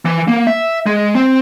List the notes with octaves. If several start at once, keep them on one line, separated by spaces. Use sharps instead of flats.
E3
A#3
E5
G#3
C4